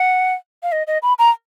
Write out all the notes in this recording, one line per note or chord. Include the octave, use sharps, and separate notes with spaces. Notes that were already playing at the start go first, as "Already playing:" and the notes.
Already playing: F#5
F5
D#5
D#5
B5
A#5